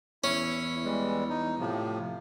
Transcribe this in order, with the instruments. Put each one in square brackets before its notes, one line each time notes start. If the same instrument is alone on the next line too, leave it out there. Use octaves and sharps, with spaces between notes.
[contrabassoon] E2 [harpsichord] C#4 [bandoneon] E4
[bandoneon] E3 G3 G#3
D#4
A2 C3 F3